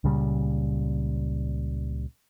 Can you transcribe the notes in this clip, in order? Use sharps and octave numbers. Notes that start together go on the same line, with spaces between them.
C#2 A#2 C#3 G3